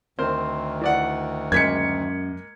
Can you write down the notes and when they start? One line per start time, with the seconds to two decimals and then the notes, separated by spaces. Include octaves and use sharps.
0.19 D2 D#3 C4 A#4 C5
0.81 E3 D5 F#5
1.52 F#2 G#3 A#3 G#6 B6 C#7